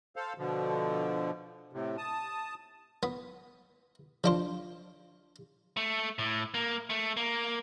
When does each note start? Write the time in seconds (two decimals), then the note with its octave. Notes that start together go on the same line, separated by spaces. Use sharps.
0.16 A4 C5 F5
0.38 B2 D3 F3
1.73 A2 C3
1.98 A5 D#6
3.03 B3
4.24 F3 D4 C5
5.77 A3
6.19 A2
6.54 A#3
6.90 A3
7.17 A#3